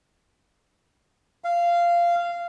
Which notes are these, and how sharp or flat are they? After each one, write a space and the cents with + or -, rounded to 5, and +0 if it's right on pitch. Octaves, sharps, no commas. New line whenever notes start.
F5 -15